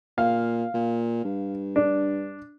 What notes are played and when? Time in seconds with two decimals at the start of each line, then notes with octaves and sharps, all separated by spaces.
0.18 A#2 F5
0.74 A#2
1.24 G2
1.76 D4